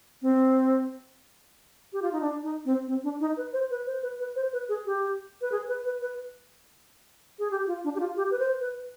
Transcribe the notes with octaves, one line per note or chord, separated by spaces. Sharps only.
C4
G4
F4
D#4
D4
D#4
C4
C4
D4
D#4
B4
C5
B4
C5
B4
B4
C5
B4
G#4
G4
B4
G#4
B4
B4
B4
G#4
G4
F4
D4
G4
F4
G4
B4
C5
B4